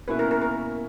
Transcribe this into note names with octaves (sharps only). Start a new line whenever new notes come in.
B2 A#3 C#4 E4 B4
A#4
A#4
A#4